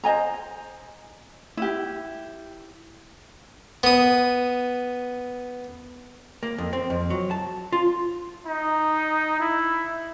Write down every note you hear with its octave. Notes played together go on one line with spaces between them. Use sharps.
C5 D#5 G#5 A#5
E4 G4
B3 D#6
A#3
F2
C4
F2
F#3
A5
F4
D#4
E4